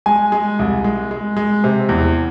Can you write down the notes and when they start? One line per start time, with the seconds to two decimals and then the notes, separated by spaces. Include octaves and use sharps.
0.06 G#3 G#5
0.32 G#3
0.59 C2
0.84 G#3
1.11 G#3
1.36 G#3
1.64 C3
1.89 E2